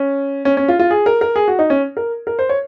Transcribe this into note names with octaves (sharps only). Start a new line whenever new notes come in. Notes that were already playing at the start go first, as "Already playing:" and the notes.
Already playing: C#4
C#4
C#4
F4
F4
G#4
A#4
A#4
G#4
F#4
D#4
C#4
A#4
A#4
C5
C#5